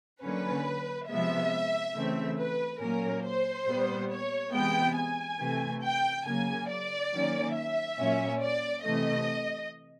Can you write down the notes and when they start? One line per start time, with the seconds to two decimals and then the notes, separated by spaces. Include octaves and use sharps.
0.22 D3 F#3 A#3 C#4 B4
1.08 C3 F3 G#3 B3 E5
1.94 C#3 E3 A3 C4
2.38 B4
2.81 A#2 F#3 A#3 C#4 A#4
3.25 C5
3.67 A#2 G3 B3
4.10 C#5
4.53 C3 E3 G#3 B3 G5
4.96 G#5
5.40 C3 E3 A3
5.82 G5
6.25 C#3 F#3 A#3 G#5
6.70 D5
7.13 D#3 F#3 A#3 C#4
7.55 E5
7.99 A#2 F#3 A#3 C#4
8.41 D5
8.84 C3 E3 A3 D#5